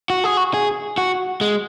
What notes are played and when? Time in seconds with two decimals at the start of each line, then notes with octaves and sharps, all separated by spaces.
0.10 F#4
0.24 G#4
0.37 F#4
0.54 G#4
0.98 F#4
1.41 G#3